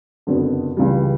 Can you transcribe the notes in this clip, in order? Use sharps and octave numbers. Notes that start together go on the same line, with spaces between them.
F#1 F2 D3 F#3 B3
C#2 C#3 E3 G3